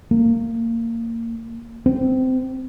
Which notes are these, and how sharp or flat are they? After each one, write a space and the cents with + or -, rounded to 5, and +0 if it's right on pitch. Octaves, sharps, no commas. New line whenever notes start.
A#3 -20
C4 -20